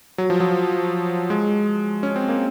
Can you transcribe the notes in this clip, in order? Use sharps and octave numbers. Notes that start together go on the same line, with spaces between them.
F#3
F3
F#3
G#3
C#4
C4
A#3